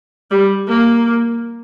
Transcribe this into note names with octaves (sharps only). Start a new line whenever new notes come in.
G3
A#3